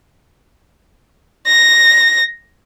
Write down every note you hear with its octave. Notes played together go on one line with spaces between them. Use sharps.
A#6